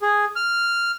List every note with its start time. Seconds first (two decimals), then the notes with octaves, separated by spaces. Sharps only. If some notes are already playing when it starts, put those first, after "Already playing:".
0.02 G#4
0.36 F6